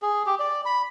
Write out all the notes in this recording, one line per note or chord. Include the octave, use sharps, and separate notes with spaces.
G#4
G4
D5
B5